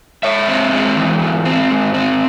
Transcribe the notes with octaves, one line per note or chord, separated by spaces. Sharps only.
G#2 C#5 E5
C4
G#3
E3
G#2
C4
G#2
C4